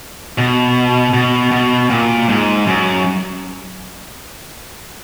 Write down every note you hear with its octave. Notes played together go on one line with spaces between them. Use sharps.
B2
B2
B2
A#2
G#2
F#2